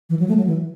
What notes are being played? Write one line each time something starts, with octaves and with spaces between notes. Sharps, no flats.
E3
F#3
A3
F#3
E3